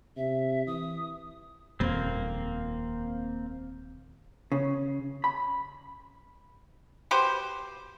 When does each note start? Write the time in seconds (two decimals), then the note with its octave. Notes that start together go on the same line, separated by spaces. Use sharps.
0.17 C3 E5
0.67 E3 D#6
1.80 D#1 F2 A#3 C4
4.52 C#3
5.24 B5
7.11 F#4 G4 B4 C5